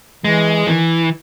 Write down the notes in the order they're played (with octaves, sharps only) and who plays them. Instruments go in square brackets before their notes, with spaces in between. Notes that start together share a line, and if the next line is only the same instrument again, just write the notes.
[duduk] E3 [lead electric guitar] G#3
[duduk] D#3 [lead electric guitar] E3